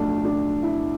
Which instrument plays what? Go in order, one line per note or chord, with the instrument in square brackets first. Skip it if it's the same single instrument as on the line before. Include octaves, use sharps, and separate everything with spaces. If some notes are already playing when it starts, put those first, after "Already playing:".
Already playing: [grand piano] B1 A2 F3 A3 D4
D4
E4